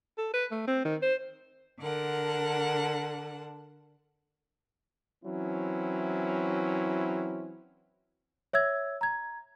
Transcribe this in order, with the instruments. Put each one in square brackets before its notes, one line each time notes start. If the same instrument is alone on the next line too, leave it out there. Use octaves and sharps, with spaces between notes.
[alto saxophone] A4
B4
A3
C4
D#3
C5
[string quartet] D3 A#4 F#5 A5
[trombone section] E3 F#3 C4 C#4 E4
[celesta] C#5 E5 E6 G#6
A#5 G#6